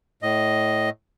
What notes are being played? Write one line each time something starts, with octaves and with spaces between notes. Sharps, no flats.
A2 D#5